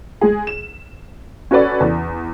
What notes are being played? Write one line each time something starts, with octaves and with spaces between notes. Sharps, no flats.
G#3 G#4
E7
C#4 F#4 A4 B4 D5
E2